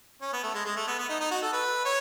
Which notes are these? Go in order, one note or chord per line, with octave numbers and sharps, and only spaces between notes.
C#4
B3
A3
G#3
G#3
A3
B3
B3
D#4
D#4
F#4
A4
B4
C#5